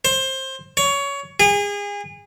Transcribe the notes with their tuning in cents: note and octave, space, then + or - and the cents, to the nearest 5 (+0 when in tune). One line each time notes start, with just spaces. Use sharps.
C5 +20
C#5 +20
G#4 -30